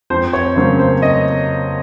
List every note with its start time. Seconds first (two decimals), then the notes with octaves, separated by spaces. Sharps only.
0.10 F2 C5
0.33 C#5
0.56 C#3 F#3 A#3 C#4 C5
0.79 C5
1.02 D#5